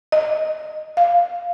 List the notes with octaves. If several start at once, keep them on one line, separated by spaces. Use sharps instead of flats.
D#5
F5